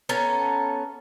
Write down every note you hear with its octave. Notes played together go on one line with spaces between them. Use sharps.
B3 C#4 A4 A#5